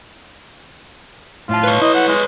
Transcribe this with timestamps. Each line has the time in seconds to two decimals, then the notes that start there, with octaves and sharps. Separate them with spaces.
1.49 A2 F4 F5 A5
1.64 B4 C#5
1.82 E4 D#5
1.95 F#5
2.08 G#3